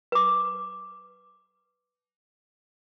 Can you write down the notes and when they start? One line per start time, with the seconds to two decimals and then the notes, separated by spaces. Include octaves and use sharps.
0.12 B4 D6